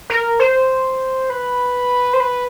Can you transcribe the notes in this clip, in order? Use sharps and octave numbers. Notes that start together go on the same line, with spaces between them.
A#4
C5
B4
C5
B4